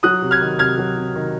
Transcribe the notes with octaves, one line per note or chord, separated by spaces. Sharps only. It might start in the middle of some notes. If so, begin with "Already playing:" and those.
F#3 D#6 F#6
C3
F6 G#6
D#3
C3 F6 G#6
F#3
C3
D#3